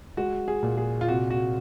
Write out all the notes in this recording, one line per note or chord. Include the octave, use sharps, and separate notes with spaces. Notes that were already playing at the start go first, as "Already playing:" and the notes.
G#3 F#4
G#4
A#2
G#4
F4
C3 F#4
F#4